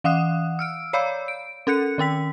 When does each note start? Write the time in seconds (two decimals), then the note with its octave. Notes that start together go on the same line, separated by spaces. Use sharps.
0.04 E3 F5 F#5 D#6 F#6
0.59 E6 F6 D7
0.93 C#5 D5 F5 B5 E6 G6
1.28 D7
1.67 C#4 A4 F#6 C#7
1.98 D#3 C#4 G5 B6